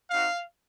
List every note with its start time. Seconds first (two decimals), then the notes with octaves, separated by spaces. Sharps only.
0.10 C4 D#4 F#4 F5